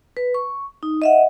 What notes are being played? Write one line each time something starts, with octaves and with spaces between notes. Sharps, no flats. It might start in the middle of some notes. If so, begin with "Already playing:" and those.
B4
C#6
D#4
D#5 E5 F#5